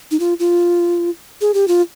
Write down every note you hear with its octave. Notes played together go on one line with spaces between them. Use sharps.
D#4
F4
F4
G#4
G4
F4